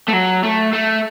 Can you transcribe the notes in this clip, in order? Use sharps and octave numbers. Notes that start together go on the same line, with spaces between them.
A3
F#3
A3
A3